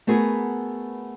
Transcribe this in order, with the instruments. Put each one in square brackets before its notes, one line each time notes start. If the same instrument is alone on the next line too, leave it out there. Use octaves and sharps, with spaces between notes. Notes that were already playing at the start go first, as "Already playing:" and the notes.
[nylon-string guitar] A3 B3 F#4 G#4 A#4 B4